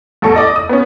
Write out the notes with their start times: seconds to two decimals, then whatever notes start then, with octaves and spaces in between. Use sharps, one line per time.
0.22 A1 E2 A4 C#6
0.36 D5 D#5
0.56 D#6
0.69 B3 C#4